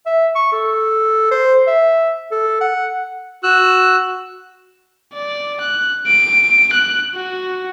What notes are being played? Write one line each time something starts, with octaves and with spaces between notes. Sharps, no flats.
E5
C#6
A4
C5
E5
A4
F#5
F#4 E6 F#6
D5
F#6
D7
F#6
F#4